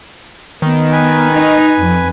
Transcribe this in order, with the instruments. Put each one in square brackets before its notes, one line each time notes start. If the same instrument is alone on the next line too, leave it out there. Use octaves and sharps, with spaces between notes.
[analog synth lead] D#3 [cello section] B3
[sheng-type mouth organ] B4 G#5
[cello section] D#4
F2